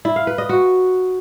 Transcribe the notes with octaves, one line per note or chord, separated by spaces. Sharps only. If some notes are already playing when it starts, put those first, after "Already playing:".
E4
F5
B4
D#5
F#4